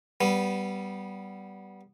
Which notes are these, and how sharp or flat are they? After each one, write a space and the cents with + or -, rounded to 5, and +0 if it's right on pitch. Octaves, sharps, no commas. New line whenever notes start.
G3 -15 B3 +0